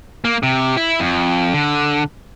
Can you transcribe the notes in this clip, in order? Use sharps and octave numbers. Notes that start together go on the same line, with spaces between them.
A#3
C3
E4
F2
D3